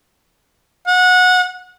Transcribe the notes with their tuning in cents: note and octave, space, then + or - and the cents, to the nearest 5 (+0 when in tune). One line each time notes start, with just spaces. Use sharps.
F#5 -20